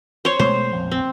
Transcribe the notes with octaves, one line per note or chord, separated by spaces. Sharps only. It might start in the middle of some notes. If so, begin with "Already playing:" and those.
C5 C#5
B2 G#3 A3 C5
A#1 F2
C4